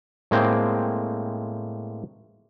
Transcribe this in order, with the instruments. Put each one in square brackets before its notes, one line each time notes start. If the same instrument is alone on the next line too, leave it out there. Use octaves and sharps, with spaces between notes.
[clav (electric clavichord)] A2 G#3 A#3 C4 C5 G5